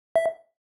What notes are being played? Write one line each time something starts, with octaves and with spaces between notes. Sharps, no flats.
E5